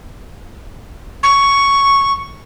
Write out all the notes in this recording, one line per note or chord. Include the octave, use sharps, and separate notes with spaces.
C#6